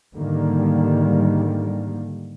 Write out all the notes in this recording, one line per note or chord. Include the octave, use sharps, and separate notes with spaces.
G#2 D3 D#3 G3 A#3